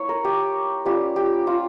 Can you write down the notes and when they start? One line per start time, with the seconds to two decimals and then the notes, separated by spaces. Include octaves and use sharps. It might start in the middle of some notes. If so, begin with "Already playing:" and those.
Already playing: A#3 E4 C#5
0.09 A#4
0.24 G4
0.85 G3 C#4 F4 G4
1.16 G4
1.47 F4